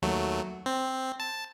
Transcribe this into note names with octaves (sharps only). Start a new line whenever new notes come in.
D#2 F#3 A3
C4
A5